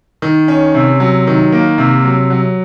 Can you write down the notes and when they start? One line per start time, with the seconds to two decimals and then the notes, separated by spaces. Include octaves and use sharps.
0.22 D#3
0.48 C#4
0.75 C3
1.00 F#3
1.27 D#3
1.52 A#3
1.78 C3
2.04 F#3
2.30 F#3